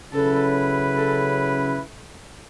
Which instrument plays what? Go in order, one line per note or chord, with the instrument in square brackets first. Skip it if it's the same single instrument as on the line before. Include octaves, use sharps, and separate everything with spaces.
[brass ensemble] C#3 F#3 C#4 E4 B4 [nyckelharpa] A4
[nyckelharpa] A4